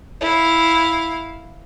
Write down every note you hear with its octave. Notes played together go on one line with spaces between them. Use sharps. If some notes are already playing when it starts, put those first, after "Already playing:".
E4 F5